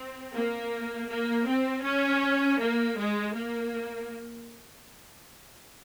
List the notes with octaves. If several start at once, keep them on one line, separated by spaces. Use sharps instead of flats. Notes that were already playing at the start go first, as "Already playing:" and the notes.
Already playing: C4
A#3
A#3
C4
C#4
A#3
G#3
A#3